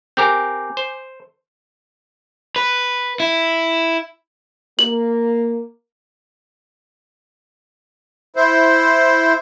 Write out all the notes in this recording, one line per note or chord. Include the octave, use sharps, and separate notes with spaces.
C4 G4 A#4 G#5 D6 G6
C5
B4
E4
A#3 F#7
E4 C5